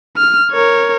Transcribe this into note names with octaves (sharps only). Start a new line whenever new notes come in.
F6
A#4 C#5